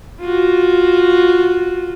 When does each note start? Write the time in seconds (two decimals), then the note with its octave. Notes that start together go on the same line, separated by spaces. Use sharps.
0.21 F4 F#4